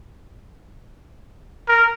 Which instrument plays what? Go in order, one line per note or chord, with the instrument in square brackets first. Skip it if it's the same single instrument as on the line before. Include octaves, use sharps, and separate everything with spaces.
[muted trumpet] A#4